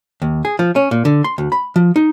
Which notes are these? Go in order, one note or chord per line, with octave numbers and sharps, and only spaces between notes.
D#2
G#4
F3
C#4
A#2
D3
C6
D2
B5
F3
D#4